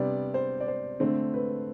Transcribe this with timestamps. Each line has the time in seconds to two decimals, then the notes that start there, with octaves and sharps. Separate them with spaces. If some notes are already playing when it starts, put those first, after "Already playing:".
Already playing: C3 G3 B3 D4 D5
0.34 C5
0.60 D5
0.68 C5
1.00 D3 A3 C4
1.34 B4